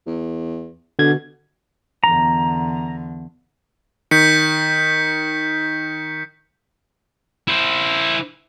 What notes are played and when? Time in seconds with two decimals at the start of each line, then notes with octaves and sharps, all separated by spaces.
0.07 E2
0.99 B2 D3 G#6
2.04 E2 D3 A#5
4.11 D#3 G6 B6 C#7
7.48 E4 C5